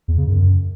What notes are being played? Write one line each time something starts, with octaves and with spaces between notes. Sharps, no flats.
E2
C#3
F#2